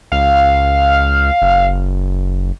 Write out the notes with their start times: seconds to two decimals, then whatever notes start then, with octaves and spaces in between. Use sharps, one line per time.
0.12 C#2 F5
1.42 F#1